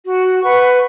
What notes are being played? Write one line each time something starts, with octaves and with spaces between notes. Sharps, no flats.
F#4
B4 F#5 C#6